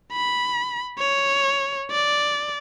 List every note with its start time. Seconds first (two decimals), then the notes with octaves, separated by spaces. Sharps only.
0.12 B5
0.98 C#5
1.91 D5